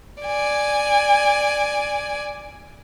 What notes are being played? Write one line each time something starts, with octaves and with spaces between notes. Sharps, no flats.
D5 G#5